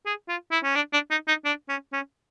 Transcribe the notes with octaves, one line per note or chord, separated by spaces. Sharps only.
G#4
F4
E4
C#4
D4
D4
D#4
D#4
D4
C#4
C#4